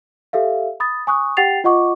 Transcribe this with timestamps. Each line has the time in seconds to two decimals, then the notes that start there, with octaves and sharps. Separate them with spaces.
0.33 G4 A4 E5 F5
0.80 B5 D#6 A6
1.07 G#5 C#6 D#6 F#6
1.37 G4 F#5 G5 A6 C7 F7
1.64 F4 D#5 F#5 C#6 D6